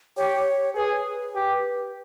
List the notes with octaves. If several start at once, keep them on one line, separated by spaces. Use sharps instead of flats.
G4 C#5
G#4 B4
G4